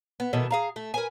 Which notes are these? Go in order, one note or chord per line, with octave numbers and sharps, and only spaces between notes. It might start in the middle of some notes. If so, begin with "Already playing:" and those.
B3
B2 D#3 E3 A3
G#4 F5 A#5
A3
A#4 B4 G#5